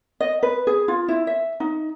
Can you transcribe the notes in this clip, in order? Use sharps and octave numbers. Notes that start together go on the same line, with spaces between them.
D#5
B4
G#4
F4
E4
E5
D#4